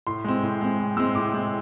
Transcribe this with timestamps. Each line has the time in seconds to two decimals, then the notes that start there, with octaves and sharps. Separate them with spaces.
0.07 A2 C6
0.24 G#3 C4
0.43 A2
0.61 G#3 C4
0.79 A2
0.97 G#3 C4 E6
1.15 A2 D6
1.33 G#3 C4